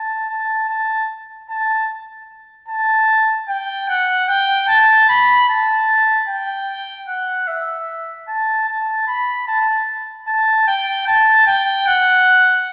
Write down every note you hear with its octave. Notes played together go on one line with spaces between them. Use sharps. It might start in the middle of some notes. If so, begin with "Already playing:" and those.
Already playing: A5
A5
A5
A5
A5
G5
F#5
G5
A5
B5
A5
G5
F#5
E5
A5
A5
B5
A5
A5
G5
A5
G5
F#5